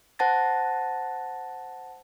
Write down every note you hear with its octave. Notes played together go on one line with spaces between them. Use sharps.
C5 F#5 A5 A6 A#6